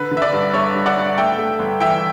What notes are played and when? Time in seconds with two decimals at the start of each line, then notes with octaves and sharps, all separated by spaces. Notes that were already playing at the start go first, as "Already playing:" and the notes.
Already playing: D3 B4
0.11 D3
0.17 E5
0.22 B4 D5
0.32 G2
0.53 G1 C#5 E5
0.75 G2
0.86 D5 F#5
0.96 G2
1.18 A3 E5 G5
1.38 A3
1.59 G1
1.80 E3 E5 G5